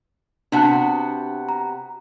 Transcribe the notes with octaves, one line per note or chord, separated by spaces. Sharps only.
C3 B3 D4 F#4 A5 F#6
A#5